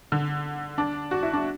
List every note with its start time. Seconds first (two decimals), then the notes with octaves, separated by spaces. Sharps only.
0.12 D3
0.78 D4
1.11 F#4
1.23 E4
1.33 D4